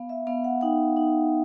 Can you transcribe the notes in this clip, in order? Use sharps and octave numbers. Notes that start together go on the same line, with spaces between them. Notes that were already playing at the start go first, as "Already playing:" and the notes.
Already playing: B3 F5
E5
B3 F5
F#5
D#4 G5
D#4